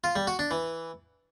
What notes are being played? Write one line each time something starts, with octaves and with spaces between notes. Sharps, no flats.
F4
G3
F#4
D4
E3